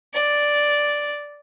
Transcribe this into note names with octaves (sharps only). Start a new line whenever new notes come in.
D5